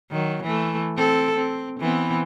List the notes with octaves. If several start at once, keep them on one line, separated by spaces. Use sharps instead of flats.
D#3 F#3
E3 A3
C4 A4
C4
E3 B3 C4